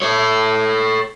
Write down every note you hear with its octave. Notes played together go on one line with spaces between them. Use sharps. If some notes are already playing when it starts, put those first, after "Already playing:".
A4 C#5